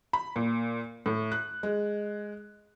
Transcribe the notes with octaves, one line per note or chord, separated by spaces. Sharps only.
B5
A#2
A2
F#6
G#3